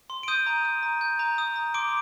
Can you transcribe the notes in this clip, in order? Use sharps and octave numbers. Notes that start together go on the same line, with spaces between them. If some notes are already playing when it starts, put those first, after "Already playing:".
C6
D7
D#6 G6 D#7
A#5
D#6
A#5
G6
A#5
D#6
A#5
C6 D6 D7